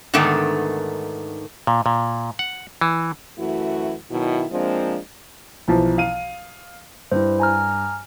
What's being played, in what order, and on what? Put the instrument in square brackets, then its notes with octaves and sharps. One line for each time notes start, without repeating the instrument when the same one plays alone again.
[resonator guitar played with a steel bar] G#2 D3 D#3 A3 B3
[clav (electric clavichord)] A#2
A#2
F#5
E3
[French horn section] F#2 E3 A3 E4 F#4
B2 D#3 F#3 E4
F3 G#3 A#3 C4 D4
[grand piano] B1 E3 F3
F5 D#7
[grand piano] G2 [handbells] E4 C5
[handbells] G#5 A#5 F6